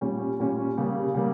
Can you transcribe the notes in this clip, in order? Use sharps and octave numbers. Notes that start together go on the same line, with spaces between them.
A#2 G3 C#4
A#2 G3 C#4
C#3 G3 A#3
C#3 G3 A#3